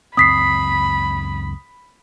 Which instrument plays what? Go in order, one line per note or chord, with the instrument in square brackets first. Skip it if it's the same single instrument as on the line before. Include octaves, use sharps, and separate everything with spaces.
[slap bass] C#2 F#2 C4 [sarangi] B5 [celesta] D#6 B6 C7